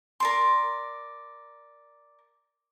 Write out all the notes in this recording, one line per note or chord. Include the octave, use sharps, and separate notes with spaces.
A#4 D5 C6